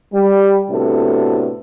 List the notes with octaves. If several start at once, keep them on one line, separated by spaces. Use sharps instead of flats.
G3
A2 C3 B3 D4 F#4 A4